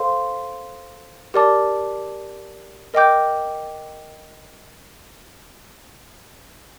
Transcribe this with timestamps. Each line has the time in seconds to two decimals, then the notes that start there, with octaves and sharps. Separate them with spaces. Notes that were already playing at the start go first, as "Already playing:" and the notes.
Already playing: A4 C5 F5 C6
1.34 G4 A#4 D5 A5 D6
2.94 A#4 D#5 G5 D6 G6